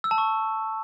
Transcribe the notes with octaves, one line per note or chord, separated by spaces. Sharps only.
E6
A5
C#6